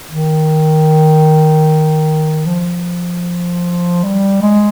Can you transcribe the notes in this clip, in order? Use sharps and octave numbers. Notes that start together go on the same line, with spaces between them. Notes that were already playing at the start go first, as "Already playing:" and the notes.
D#3
F3
G3
G#3